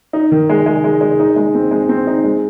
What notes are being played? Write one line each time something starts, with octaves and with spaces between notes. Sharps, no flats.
D#4
D#3
G#3
G#3
G#3
G#3
D#4
G#3
C4
G#3
C4
D#4
G#3